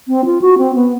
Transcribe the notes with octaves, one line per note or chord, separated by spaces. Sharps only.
C4
F4
F#4
C4
B3